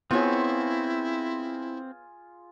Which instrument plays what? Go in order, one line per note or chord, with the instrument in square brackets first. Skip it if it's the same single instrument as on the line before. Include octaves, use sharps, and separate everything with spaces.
[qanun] B3 C#5 [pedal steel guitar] C4 [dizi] E4 [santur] F4 G#4